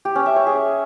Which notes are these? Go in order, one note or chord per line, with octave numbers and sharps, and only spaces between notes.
G4
C#4
E5
C#5
G#4